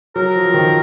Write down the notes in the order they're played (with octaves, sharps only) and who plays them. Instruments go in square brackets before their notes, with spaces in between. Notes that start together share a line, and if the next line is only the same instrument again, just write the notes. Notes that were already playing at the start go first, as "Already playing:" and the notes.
[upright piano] F#3 [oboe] A#4
[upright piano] F3
F3
D#3